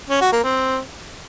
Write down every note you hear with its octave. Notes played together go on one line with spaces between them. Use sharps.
C#4
F#4
A#3
C4